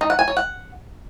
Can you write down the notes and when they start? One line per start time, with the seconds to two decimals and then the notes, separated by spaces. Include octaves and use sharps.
0.01 D#4
0.10 F#5
0.19 G#5
0.28 C#5
0.37 F#5